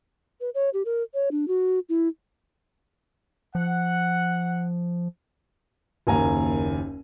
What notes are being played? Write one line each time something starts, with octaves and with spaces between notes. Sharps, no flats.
B4
C#5
G4
A#4
C#5
D4
F#4
E4
F3 F#5
F#1 D#2 G#5 A#5